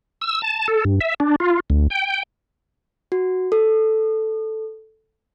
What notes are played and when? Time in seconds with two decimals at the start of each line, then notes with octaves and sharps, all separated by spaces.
0.21 E6
0.42 A5
0.68 A4
0.85 G2
1.01 E5
1.20 D4
1.40 F4
1.70 D2
1.90 G5
3.12 F#4
3.52 A4